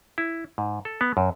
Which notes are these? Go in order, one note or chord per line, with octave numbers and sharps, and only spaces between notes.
E4
G#2
A4
B3
F#2